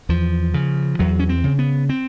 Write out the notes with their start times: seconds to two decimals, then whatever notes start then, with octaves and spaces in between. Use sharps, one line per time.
0.09 E2 F3
0.54 C#3
0.99 E2 F#3
1.19 C#4
1.29 C4
1.44 C#3
1.59 B3
1.89 C4